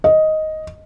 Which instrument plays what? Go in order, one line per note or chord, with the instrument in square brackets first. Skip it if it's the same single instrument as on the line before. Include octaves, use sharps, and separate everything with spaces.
[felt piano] D#5